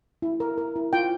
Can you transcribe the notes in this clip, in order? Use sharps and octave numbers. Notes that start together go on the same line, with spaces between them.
E4
A#4
A#4
E4
F4 G5